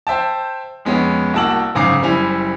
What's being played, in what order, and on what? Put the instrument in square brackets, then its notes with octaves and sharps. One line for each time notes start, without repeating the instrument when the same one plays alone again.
[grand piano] C5 E5 G5 A5
F2 G#3 B3 C#4
C2 A#3 F#4 A5 E6 F#7
F#1 G#2 C#3 A#5 D6 C7
F#1 G3 C4 E4 G#5 F7